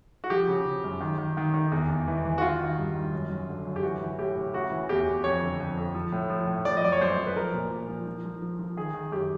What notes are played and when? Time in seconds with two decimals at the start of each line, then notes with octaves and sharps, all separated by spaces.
0.24 F#4
0.30 F3 G4
0.48 C#3
0.66 C#3
0.84 F#2
1.01 D#3
1.18 D#3
1.37 D#3
1.54 D#3
1.72 E2
1.90 E2
2.08 E3
2.25 E3
2.38 F#4
2.42 D#3 F4
2.60 D#3
2.78 G2
2.95 D#3
3.12 F#2
3.30 F#2
3.49 D3
3.65 F#2
3.76 G4
3.83 E3 F#4
4.01 E3
4.18 A2 G4
4.36 A2
4.53 C#3 F#4
4.71 E3
4.89 E2 G4
5.07 E2
5.24 F2 C#5
5.42 D3
5.60 F2
5.77 F2
5.95 F3
6.12 A2
6.30 F3
6.47 A2
6.65 F3 D5
6.77 D#5
6.83 F#2 D5
6.92 C#5
7.01 F#2 C5
7.18 F#2
7.27 B4
7.36 F3 A#4
7.54 A#2
7.71 A#2
7.88 F3
8.07 F3
8.25 F3
8.42 F3
8.59 F3
8.77 D#3 G#4
8.94 D#3
9.12 F#2 G4